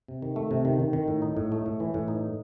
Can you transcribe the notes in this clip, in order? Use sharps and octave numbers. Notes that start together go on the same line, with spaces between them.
C3
D#3
A3
C3
D#3
D#3
D#3
A2
D#4
A2
A3
A2
E3
A2
D#4